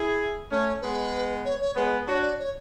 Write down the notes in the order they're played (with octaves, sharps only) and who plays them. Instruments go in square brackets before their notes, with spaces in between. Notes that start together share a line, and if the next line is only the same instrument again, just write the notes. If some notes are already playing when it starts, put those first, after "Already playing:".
Already playing: [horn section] E4 G#4
[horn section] A3 C#4 [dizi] C#5
[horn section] G#3 B3 [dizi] B4
[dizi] C#5
C#5
[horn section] G#3 B3 [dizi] B4
[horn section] D4 F#4 [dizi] C#5
[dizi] D5
C#5